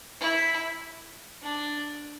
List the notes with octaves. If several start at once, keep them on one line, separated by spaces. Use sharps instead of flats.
E4
D4